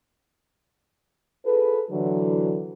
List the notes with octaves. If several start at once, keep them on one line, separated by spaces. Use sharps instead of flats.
F4 G#4 A4 B4
D3 E3 F#3